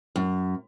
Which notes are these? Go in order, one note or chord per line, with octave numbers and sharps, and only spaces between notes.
F#2